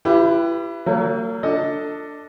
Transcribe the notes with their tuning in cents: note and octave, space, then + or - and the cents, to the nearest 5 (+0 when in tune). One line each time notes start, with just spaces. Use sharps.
E4 +35 G4 +0 B4 +0
F#3 +35 A#3 -35
D4 +0 A4 +25 D#5 +15